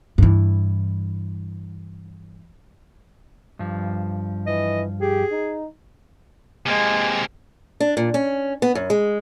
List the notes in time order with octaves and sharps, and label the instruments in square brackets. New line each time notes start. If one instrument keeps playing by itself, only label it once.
[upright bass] G2 E3
[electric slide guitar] G2 F3
[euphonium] E3 [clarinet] D#5
[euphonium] G4 [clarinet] G#4
[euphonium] D#4
[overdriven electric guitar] C3 A#3 [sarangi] G#3
[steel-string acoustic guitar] D4
A#2
C#4
B3
F#2
G#3